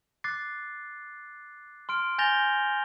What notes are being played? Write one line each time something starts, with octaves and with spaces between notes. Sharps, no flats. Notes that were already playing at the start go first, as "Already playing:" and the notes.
D6 F#6 A6 C7
C6 F6 D7
G#5 G6 A6 A#6 F7 G7